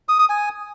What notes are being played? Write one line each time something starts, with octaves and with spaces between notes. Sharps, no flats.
D#6
D#6
G#5